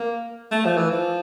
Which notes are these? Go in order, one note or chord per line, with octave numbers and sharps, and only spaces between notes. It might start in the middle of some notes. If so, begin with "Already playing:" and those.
Already playing: A#3
A3
F3
E3
F3